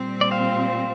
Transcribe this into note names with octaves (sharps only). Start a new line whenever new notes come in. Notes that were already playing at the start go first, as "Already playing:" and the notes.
Already playing: A#2 G3 C4
D5
C5 F5